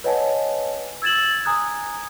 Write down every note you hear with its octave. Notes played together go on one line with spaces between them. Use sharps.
B4 C#5 D#5 F#5 G#5 A5
E6 G#6 A6 E7 F#7
G#5 A#5 D#6 F#6 G#6